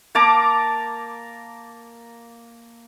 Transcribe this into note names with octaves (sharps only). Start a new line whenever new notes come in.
A#3 A5 A#5 D6